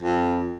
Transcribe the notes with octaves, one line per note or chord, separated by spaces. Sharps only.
F2